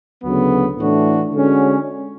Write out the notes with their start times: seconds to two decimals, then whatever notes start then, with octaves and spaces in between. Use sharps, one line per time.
0.23 D2 C#3 F#3 B3
0.79 A2 E3 A3 D4 F#4
1.33 D3 G#3 C#4 F#4